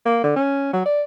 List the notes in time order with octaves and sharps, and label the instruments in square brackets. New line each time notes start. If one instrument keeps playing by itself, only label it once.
[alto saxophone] A#3
D3
C#4
F#3
D5